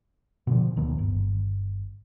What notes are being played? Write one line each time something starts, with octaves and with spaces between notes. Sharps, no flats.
B2 D3 F3
D1 D#3 B3
G1